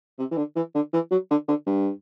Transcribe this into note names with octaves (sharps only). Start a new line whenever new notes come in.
C3
E3
D3
E3
D3
E3
F#3
D3
D3
G2